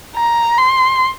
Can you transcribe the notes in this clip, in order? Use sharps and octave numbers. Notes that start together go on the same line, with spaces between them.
A#5
C6